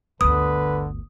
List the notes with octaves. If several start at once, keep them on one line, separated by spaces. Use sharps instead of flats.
G1 D2 D3 B4 D#6